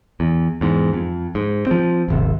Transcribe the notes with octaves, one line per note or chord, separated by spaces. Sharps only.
E2
E2 G#2
F2
G#2
F3 C4
D#1 G#1 C3